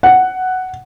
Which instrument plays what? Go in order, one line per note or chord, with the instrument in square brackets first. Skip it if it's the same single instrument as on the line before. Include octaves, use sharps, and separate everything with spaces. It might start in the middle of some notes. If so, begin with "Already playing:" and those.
[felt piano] F#5